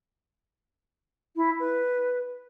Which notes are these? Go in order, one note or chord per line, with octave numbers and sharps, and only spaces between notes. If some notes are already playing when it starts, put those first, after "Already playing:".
E4
B4